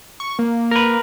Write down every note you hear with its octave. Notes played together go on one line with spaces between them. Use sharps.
C#6
A#3
A#4 B4